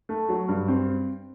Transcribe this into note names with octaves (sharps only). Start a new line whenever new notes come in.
A3
F#3
G2
C4